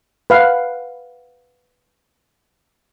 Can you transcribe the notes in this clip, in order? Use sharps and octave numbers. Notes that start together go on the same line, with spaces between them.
B4 F5 F#5